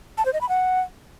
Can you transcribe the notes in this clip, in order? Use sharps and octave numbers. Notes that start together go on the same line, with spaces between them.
A5
C5
D#5
B5
F#5